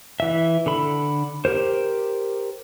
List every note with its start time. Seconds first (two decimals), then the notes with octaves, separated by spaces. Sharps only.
0.20 E3 E5
0.66 D3 A4 B5
1.45 G4 A#4 C5